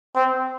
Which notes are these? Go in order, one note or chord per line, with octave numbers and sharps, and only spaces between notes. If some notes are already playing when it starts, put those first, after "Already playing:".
C4